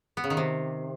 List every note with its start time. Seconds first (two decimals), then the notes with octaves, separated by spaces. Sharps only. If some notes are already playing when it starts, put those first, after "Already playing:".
0.17 B3
0.24 C#3
0.30 D#3
0.37 C3